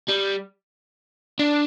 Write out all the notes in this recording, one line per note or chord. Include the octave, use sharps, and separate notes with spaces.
G3
D4